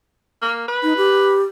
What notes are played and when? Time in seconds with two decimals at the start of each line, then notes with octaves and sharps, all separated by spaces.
0.42 A#3
0.68 B4
0.83 D#4
0.97 G4